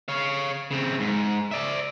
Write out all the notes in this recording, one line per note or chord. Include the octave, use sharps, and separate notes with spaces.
C#5 F5
C#3 C4
G#2
D5 E5